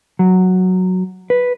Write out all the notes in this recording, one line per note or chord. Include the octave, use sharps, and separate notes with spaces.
F#3
B4